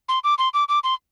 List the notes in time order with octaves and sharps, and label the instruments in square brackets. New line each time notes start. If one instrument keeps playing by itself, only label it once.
[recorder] C6
D6
C6
D6
D6
C6